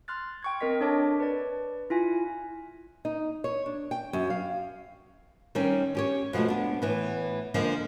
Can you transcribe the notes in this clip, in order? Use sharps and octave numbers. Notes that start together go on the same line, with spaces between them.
C6 F6 F#6 A6
G5 C#6 G#6
C4 A#4 D#5 B6
D4 A4 C#5 A5 D6
B4 D5
E4 F4 G#5
D#4
C#5
D4
G5
F#2
F5
D#3 G3 C4 C#4 D#4
C#4 G4 C#5
B2 F3 F#3 G#3 A3
B3 D4
A2 E3 B3
D3 F3 G#3 A#3